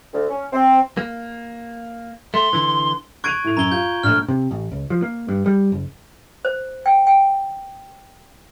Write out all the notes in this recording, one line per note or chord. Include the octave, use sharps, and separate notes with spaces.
D2
C#4
C4
A#3
A3 C6
D3 E3
C#6 F#6 G#6 D7 D#7 F7
A2 F7
F#2 A#5 G#6 G7
F4 G6
A#1 A3 F6
C3
A1
C#2
F3
A#3
G2
G3
F#1
C5
G5
G5